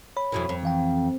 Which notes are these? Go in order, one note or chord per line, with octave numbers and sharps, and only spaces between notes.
C#5 B5
F2 B2 E3
F2
E3 F5 G5